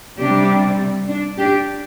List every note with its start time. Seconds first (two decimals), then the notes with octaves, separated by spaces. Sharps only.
0.19 C3 G3 D4 G4
1.09 D4
1.38 D4 G4